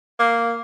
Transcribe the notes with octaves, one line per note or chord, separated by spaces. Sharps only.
A#3